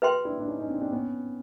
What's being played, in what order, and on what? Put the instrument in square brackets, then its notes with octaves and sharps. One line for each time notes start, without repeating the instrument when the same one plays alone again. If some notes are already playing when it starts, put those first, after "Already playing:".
[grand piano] F#4 G#4 [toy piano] B4 E5 G5 C6
[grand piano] D4 E4
D4
C#4 D#4
C#4 D#4
C4 D4
C4 D4
B3 C#4